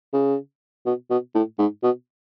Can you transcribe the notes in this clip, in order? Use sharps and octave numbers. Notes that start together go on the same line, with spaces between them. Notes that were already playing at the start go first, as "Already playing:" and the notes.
C#3
B2
B2
A2
G#2
B2